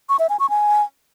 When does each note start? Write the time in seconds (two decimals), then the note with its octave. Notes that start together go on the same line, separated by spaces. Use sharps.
0.09 C#6
0.19 E5
0.29 G#5
0.40 C#6
0.50 G#5